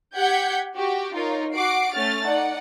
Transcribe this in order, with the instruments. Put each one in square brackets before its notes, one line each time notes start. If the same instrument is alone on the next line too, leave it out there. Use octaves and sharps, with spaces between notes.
[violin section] G4 F#5 G6 G#6 B6 C#7
F#4 G4
D#4 F4 A#4 C#5
F#4 F#5 D6 C7 D7
A3 C#4 F6 A6
D#4 D5 F#5